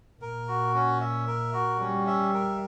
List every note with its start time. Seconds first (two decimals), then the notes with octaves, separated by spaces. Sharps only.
0.21 A#2 A#4
0.48 F#4
0.75 C#4
1.01 E5
1.27 A#4
1.54 F#4
1.80 G3 C#4
2.07 E5
2.34 A#4